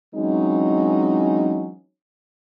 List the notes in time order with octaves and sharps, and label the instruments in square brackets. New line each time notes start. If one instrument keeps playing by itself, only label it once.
[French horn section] E3 F#3 G#3 C4 C#4 D#4